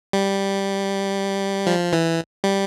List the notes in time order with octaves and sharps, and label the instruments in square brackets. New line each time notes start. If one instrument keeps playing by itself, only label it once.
[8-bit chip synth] G3
F3
E3
G3